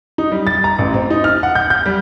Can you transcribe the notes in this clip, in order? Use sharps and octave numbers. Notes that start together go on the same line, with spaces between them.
D#4
G3
A6
A#5
A1
C4
D#4
F6
F#5
G6
G6
G3